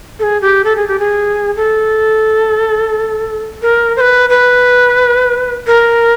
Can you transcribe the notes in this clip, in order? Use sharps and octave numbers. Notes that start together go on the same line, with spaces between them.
A4
G#4
G4
A4
G#4
G4
G#4
A4
A#4
C5
B4
B4
A#4